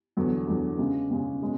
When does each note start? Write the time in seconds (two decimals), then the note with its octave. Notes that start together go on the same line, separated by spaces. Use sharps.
0.17 E2 D3 F#3
0.47 E2 D3 F#3
0.78 C#3 G#3 C#4
1.11 C#3 G#3 C#4
1.42 B2 G#3 C#4